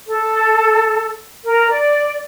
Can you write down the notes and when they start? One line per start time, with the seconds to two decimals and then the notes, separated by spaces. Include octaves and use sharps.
0.08 A4
1.45 A#4
1.69 D5